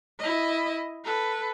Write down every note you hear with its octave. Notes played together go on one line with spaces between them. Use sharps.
E4 D#5
A4 B4